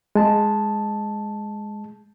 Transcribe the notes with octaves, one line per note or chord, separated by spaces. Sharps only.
G#3 A5